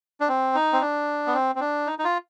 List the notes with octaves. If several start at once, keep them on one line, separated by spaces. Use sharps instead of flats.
D4
C4
D#4
C4
D4
B3
C4
C4
D4
D#4
D#4
F4